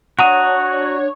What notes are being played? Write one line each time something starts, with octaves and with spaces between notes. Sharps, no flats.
D4 F#4 C#5 F#5 A#5 D#6